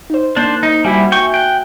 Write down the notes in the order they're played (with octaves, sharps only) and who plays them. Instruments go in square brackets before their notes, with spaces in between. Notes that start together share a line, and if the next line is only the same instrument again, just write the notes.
[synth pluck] D#4 C5
[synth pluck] A#3 [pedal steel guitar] D4 C5
[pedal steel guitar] D#4
[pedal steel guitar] G3 E4 [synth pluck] F#4 E5 G#5
[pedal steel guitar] G5 C#6
[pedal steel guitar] G5 [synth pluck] F#6